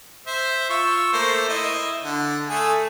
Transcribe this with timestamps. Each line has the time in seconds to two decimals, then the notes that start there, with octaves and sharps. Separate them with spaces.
0.27 C5 E5
0.70 F4 C#6 E6
1.13 A3 A#3 C5
1.49 E4 D#5
2.04 D3
2.49 A3 G#4 A4